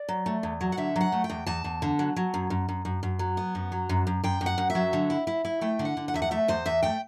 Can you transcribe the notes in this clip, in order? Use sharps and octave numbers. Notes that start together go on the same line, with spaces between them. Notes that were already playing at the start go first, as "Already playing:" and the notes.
Already playing: D5
F#3
A3
E2
F#3
F#5
D3 E5
F#3 F#5
A3
G5
E2
E2 A5
E2
D3
F#3
F#3
F#2
F#2
F#2
F#2
F#2
F#3
B3
F#2
F#3
F#2
F#2
F#2 G5
F#2
F#5
F#2
E5
F#3
D3
E4
E4
E4
A3 G5
D3
F#5
D3
F#5
E2 E5
F#5
A3 E5
E2 C5
E2 E5
A3 G5